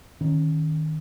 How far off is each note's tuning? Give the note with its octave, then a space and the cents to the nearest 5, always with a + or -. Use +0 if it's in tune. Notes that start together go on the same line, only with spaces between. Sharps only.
D#3 +0 C#4 -5